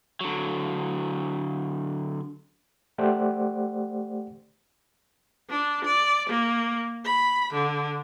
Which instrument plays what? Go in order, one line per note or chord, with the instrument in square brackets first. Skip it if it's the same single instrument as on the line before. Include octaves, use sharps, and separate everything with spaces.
[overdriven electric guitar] D3 F#3
[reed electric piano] A3 G4 C5 D5 F#5
[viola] D4
D5
A#3
B5
D3